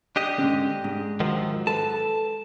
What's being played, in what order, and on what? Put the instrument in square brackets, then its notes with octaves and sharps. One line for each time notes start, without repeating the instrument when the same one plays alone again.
[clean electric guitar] D4 G4 D#5
[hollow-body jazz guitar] G#2 D3 C#4
G#2
[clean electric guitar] D#3 F3 F#3
[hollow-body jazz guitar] A4 B4 [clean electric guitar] A5